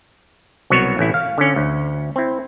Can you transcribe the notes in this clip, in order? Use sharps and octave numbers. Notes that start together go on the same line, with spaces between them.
C2 B2 F#3 B3 F#4 C#5
A1 E4
F5
D3 C#4
D2
C4 E4